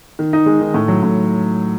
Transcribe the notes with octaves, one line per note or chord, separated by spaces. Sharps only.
D#3
D#4
G#3
D#3
A2
F#3
A2